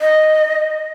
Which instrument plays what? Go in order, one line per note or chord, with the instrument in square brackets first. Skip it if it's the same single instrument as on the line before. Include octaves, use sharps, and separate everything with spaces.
[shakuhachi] D#5